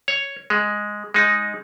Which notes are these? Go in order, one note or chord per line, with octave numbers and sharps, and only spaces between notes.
C#5
G#3
G#3 D#4